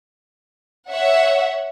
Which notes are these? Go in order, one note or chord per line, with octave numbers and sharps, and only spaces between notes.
C#5 E5 F#5